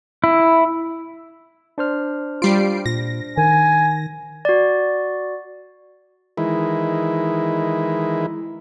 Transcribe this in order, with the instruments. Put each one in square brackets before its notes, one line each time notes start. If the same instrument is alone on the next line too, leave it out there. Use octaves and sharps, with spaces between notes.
[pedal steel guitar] E4
[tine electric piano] D4 C5 F6
[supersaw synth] G3 C7 D7 [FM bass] F4
[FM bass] A#2 [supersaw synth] A#6
[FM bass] D#3 [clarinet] G#5
[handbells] F#4 D5
[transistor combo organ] D#3 E3 G#3 E4